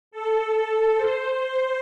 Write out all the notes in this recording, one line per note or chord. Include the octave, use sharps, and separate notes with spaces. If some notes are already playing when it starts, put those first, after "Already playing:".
A4
C5
C5